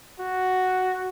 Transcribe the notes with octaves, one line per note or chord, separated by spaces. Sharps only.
F#4